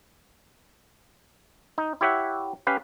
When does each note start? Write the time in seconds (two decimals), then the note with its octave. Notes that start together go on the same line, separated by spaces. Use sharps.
1.78 D#4
2.01 E4 G4 C#5 E5 F#5
2.67 C#4 G4 B4 F5